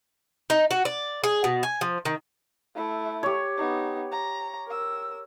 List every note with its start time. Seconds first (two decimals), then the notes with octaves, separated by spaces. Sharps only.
0.50 D#4
0.71 F#4
0.85 D5
1.24 G#4
1.44 B2
1.63 G#5
1.81 F3
2.05 D#3
2.76 A3 E4
3.23 G4 C#5
3.57 B3 D#4
4.12 A#5
4.67 A#4 E6